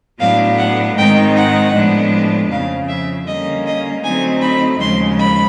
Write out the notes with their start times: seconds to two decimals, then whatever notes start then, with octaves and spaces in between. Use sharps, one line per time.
0.19 A2 F#3 B3 D4 F5
0.58 F#5
0.97 G#2 D#3 G#3 C4 D#4 G5
1.35 F#5
1.74 A2 F3 G#3 B3 D4
2.50 F2 C#3 F3 F5
2.88 E5
3.27 D3 G3 A#3 C#4 D#5
3.66 D#5
4.03 D3 F#3 A3 C4 D#4 G#5
4.41 B5
4.80 D#2 C#3 F3 G#3 C6
5.18 B5